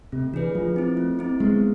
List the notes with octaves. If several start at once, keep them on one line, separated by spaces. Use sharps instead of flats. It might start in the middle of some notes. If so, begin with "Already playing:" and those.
C3 A3
E3 D4 G#4 B4
F3 A3
C4 E4
A3
C4 E4
G#3 B3